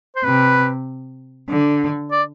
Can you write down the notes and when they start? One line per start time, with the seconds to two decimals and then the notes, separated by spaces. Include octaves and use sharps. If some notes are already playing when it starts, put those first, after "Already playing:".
0.16 C5
0.25 C3 B4
1.50 D3
2.12 D5